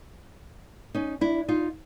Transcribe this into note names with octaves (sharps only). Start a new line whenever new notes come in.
C#4 D#4
D4 E4
D#4 F4